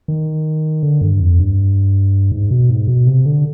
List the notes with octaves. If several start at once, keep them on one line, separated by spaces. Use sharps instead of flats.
D#3
D3
G2
F2
G2
G#2
B2
G#2
B2
C3
D3